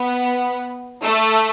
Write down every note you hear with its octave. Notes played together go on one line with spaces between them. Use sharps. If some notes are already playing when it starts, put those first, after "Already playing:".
Already playing: B3
A3